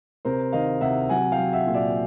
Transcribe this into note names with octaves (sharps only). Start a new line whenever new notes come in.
C3 A#4 C5
D#3 D#5 F5
C3 E5 F#5
F#3 F#5 G#5
F5 G5
F#3
E5 F#5
A#2
D5 E5